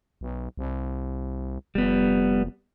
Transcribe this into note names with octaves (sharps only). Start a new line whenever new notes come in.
B1
C2
F1 G3 B3